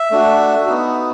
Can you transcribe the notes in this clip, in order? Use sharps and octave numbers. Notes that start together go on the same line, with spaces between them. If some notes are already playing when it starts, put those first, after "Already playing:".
Already playing: E5
A3 D4 F#4
B3 D#4 F#4